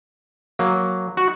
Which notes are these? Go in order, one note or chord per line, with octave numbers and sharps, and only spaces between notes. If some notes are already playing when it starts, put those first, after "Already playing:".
F#3 A#3
F#4